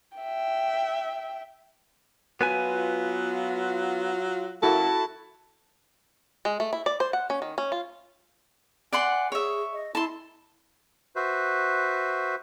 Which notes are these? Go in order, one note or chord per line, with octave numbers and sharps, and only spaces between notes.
E5 G5
F#3 B3 F4 B4 G#5
F#2 A#3 E4 F#4 A4 A5
G#3
A3
E4
D5
C5
F#5
C#4
D#3
C#4
F4
D5 F#5 G#5 C6
G#4 C#5 E5
D#5
E4 A5 C6
F#4 B4 C5 E5